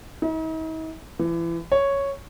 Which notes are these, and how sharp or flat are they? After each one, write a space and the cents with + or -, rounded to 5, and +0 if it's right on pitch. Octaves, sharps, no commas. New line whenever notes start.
D#4 +45
E3 +30
C#5 +0